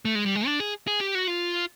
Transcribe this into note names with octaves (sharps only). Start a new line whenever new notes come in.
A3
G#3
G3
G#3
D4
G#4
G#4
G4
F#4
F4